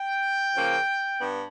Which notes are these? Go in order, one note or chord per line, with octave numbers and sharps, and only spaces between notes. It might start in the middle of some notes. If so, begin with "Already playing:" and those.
Already playing: G5
C#3 F3 A#3 C#4
G2 B3